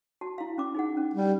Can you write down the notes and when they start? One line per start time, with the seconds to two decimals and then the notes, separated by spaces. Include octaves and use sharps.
0.21 F#4 A5
0.38 E4 F5
0.58 C#4 D6
0.74 D#4 G#4 F#5
0.97 C#4
1.14 G3